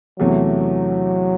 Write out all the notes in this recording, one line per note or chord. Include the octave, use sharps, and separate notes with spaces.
E2 C3 E3 F#3 A3